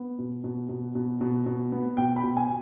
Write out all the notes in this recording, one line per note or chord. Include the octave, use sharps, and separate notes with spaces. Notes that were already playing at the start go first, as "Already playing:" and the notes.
Already playing: B3
B2
B2
B2
B2
B2
B2
B3
B2 G5
B5
B2
G#5